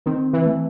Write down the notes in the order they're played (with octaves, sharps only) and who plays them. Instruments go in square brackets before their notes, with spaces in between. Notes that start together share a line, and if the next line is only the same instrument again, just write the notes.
[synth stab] D#3 [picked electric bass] C4
[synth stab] E3
[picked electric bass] A3